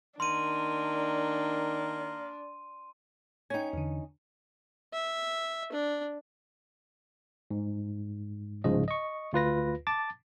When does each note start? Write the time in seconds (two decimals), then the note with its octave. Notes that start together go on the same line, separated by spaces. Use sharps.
0.20 D#3 A#3 D4 C6 D#7
3.50 C#4 D#4 G5 G#6
3.73 E2 D3
4.94 E5
5.73 D4
7.51 G#2
8.64 C2 G#2 C#3 F3 D#5
8.88 D#5 C#6
9.33 D2 F4 B4 A#6
9.87 A5 D6 A6